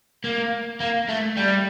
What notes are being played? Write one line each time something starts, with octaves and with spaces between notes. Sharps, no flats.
A#3
A#3
A3
G3